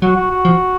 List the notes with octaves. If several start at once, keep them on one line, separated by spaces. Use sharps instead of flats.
F#3 F#4
F#4
F#4
F3